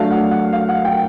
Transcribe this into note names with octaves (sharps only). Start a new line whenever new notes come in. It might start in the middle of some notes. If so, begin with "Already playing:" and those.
Already playing: F#3 A3 D4 F5
F#5
F#5
F5
F#5
G5